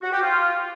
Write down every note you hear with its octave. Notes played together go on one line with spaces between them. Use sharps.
F#4
G4
F4